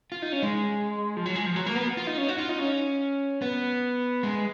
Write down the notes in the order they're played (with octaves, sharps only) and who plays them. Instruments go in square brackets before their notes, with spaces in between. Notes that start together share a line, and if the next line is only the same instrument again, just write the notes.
[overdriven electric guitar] F4
D#4
C#4
G#3
F3
F#3
G#3
F3
F#3
A#3
B3
F4
D#4
C#4
F#4
F4
D#4
C#4
B3
G#3